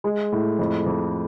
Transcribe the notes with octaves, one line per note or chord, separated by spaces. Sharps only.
G#3
A2
F2
F2